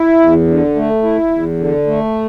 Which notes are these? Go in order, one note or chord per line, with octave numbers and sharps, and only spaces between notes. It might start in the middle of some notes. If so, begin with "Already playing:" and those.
Already playing: E4
E2
D3
A3
E4
E2
D3
A3